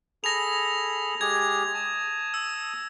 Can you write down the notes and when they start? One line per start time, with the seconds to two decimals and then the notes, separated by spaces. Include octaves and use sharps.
0.24 G#4 A4 B5 A#6 F7
1.21 G#3 G4 G#4 G#6
1.74 A5 D#6
2.34 E6